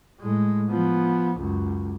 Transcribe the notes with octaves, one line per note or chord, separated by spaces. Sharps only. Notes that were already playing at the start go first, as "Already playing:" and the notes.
A2 G#3
F3 B3
C#2 F#2